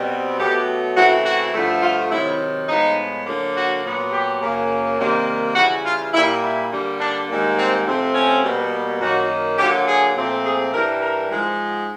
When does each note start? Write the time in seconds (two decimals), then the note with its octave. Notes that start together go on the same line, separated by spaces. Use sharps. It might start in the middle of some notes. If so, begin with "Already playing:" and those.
Already playing: B2 G3 C4
0.39 B2 F#3 A3 G4
0.96 C#3 E3 A3 C4 F#4
1.25 F#4
1.54 G2 D3 F3 A3
1.82 F4
2.11 C3 D#3 F#3 E4
2.68 A2 F3 G#3 B3 D#4
3.26 D3 F#3 A#3
3.55 F#4
3.84 A#2 F#3 B3
4.12 G4
4.41 F#2 C#3 F#3 A#3
4.99 C3 D#3 G3 A#3
5.55 C#3 E3 G3 F#4
5.85 F4
6.13 A#2 G3 A#3 E4
6.42 E4
6.71 D3 G3 A#3
6.99 D4
7.28 G#2 D#3 G3 A#3
7.58 C4
7.86 C3 F3 A3 C4
8.14 C#4
8.43 B2 G3 A#3
9.00 F#2 D#3 F#3 A#3 F#4
9.58 D3 F#3 A#3 G4
9.87 G#4
10.16 A#2 F3 A3 C4
10.44 G#4
10.73 G2 E3 G3 A#4
11.02 A#4
11.30 G#2 F3 G#3